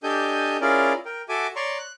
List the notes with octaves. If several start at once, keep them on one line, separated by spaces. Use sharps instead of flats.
D4 G4 A4 D#5 G#5 G6
C#4 E4 F4 G#4 A#4 D5
A#4 G5
F#4 A4 E5 G#5 D6
C#5 D5 A#5 C6 C#6
F#6